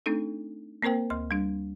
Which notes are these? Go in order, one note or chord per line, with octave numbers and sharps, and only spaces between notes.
A3 C4 D4 D#4 A4
A#3 C4 A#4 C5 G5
D2 C6
G3 D4